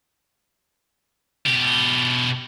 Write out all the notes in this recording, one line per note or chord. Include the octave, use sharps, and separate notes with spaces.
B2 G4